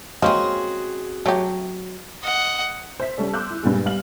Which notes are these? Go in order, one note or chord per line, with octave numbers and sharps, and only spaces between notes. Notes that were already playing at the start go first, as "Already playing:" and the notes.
G#3 A#3 C4 C#4 F#4 G#4 D#5
F#3 A3 G4
D#5 F#5
C5 E5 B6
G3 C#4 A4 D5
C6 D6 E6 F#6 G6
E4
G2 A#2 G3 G#3
G3 F5 F6 F#7